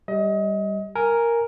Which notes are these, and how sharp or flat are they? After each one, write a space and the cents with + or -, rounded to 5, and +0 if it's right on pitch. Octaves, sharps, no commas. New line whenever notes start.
G3 +0 D#5 +30
A#4 +0 G#5 +0